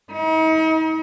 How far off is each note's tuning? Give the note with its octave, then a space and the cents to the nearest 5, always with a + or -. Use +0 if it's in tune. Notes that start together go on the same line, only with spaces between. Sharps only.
D#4 +40